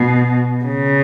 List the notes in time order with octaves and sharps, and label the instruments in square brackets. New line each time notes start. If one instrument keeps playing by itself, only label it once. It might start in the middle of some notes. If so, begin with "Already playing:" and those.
Already playing: [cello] B2
C#3